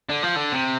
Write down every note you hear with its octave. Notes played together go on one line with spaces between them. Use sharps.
D3
F3
D3
C3